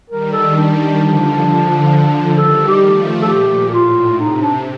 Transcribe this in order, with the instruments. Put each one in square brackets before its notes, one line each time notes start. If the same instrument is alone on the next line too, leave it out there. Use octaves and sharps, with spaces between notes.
[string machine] D#3 G3 [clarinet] A#4
[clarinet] A4
[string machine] D#3 G3 [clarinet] D4
[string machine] D3 F3
D3 F3
[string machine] D#3 G3 [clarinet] A4
[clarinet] G4
[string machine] F3 A3
[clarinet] A4
[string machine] A#2 [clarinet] G4
[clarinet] G4
[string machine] A2 [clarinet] F4
[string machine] C3 [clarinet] D#4
[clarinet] D4